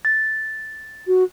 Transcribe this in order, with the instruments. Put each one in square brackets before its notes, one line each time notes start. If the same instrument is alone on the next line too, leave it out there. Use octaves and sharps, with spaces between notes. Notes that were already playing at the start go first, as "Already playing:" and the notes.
[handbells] A6
[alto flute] F#4